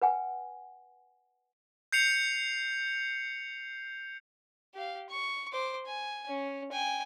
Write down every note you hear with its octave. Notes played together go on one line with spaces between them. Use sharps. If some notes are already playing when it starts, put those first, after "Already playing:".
B4 F#5 G#5
G6 C7 C#7 F7
G4 F5
C#6
C5 D6
G#5
C#4
G5 G#5